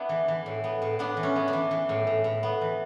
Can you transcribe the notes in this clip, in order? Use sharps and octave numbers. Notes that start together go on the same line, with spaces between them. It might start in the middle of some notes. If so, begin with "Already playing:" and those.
Already playing: B3 D4 E4
E3
E3
A2
B3
A2
B3 D4
E3
C#4
B3
D4
E3
E3
A2
A2
A2
B3
E3